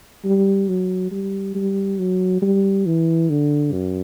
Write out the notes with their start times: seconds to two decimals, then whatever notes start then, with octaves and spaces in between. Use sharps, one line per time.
0.25 G3
0.68 F#3
1.12 G3
1.55 G3
1.99 F#3
2.42 G3
2.86 E3
3.30 D3
3.73 F#2